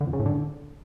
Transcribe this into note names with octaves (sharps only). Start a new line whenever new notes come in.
D3
F2
C#3
A2
D3